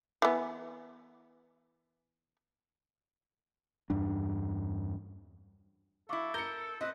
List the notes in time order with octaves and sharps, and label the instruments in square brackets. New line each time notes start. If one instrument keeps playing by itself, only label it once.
[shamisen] E3 B3
[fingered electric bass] E2 G2 D4
[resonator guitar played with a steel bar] F#3 E4 [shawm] A4 [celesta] F5 C#6 D6
[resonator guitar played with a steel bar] A#4 [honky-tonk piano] G6 C#7 [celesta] G7
[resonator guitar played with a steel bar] C4 [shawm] B4 [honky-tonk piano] D#5